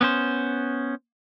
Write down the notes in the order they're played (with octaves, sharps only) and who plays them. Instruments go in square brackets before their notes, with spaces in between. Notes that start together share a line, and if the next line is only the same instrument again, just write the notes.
[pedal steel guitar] B3 C#4 C5